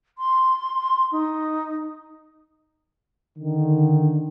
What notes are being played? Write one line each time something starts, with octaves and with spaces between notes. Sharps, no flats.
C6
D#4
D3 D#3